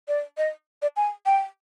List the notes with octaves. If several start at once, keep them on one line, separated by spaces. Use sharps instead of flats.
D5
D#5
D5
G#5
G5